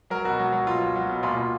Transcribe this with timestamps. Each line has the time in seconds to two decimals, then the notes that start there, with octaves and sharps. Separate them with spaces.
0.10 F#3 A#4
0.24 B2 F#4
0.39 F#3
0.52 F#3
0.67 B2 F4
0.81 F#3
0.95 F#3
1.09 B2
1.23 A#2 F4
1.37 A#2